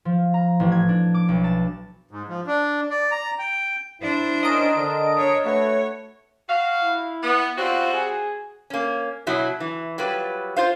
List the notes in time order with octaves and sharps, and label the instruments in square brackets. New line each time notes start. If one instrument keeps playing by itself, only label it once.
[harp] F3
A#5
A1
G#6
D4
D6
B1
A5
[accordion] G#2
F3
D4
D5
A#5
G5
[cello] D4 C5 [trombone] E4
[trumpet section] C#4 D#4 A#4 [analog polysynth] D#5 D7
[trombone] D3 [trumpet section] A#4 A5 D#6
[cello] D4 C#5
[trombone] A3 [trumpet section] F#4 B4 [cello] C#5
[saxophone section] F#4 F5
[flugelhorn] E4
[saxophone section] B3
[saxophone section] G3 C4 F#4 [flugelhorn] F4
[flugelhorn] G#4
[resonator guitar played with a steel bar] A#3 C#4
B2 F#3 E4
E3
F#3 G3 F4 B4
F4 C5 F5